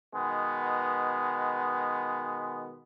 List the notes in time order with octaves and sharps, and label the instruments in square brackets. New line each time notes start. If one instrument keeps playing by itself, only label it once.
[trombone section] B2 D#3 G#3 B3